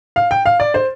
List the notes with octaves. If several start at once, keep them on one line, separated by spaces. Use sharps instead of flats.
F5
G5
F5
D5
C5